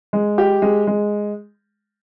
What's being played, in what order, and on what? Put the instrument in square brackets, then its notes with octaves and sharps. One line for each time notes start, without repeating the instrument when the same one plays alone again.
[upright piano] G#3
G4
G#3
G#3